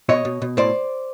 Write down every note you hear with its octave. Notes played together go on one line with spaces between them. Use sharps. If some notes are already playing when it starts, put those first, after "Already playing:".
B2 C#5 D#5
B2
B2
A2 C5 D5